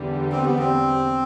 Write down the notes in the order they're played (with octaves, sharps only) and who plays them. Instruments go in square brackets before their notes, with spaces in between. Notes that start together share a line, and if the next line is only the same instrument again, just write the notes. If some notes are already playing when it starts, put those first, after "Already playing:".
Already playing: [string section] E2 D3 G3
[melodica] C4
B3
C4